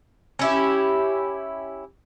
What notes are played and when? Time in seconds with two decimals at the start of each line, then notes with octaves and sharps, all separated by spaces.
0.39 C#4 E4 G4